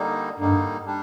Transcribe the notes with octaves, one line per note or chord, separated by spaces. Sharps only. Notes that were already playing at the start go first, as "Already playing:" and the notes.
Already playing: D3 G3 A#3 D#4
G2 D3 G3 A#3 D#4
G3 D4